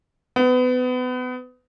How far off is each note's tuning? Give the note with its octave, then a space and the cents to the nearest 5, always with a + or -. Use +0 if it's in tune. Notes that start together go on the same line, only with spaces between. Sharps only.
B3 +30